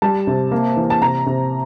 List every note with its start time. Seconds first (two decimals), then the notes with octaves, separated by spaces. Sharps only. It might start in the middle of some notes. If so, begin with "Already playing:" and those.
0.02 G3 A5
0.27 C3
0.51 A#3
0.77 E3
0.90 A5
1.02 C3 A#5
1.26 C3